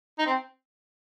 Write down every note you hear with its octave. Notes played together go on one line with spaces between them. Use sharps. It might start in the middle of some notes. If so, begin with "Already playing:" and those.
D#4
C4